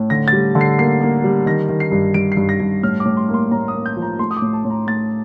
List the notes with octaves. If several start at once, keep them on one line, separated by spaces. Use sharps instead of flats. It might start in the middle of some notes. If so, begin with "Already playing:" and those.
Already playing: A2
D3 A#6
G3 A6
D3
C7
A#3 C7
A#3
G3
D#3 A#6
D#3
C7
G2
G2 D7
C7
G2
A#6
G2
A2 F6
D6
A2
C6
A#3
C6
A2 A#5
D#6
A#3
G6
F3
A#5
A3 C6
D#6
D6
A2
A5
A2
A#5
A3 A6